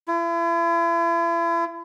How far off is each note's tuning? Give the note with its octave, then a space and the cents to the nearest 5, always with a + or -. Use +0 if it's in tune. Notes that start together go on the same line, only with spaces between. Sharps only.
E4 +40